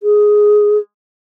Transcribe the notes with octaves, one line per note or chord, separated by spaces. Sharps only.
G#4